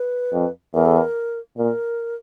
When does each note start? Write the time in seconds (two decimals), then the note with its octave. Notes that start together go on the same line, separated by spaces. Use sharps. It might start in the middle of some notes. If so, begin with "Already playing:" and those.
Already playing: B4
0.33 F2
0.74 E2 A#4
0.85 A4
0.96 A#4
1.57 A#2 A#4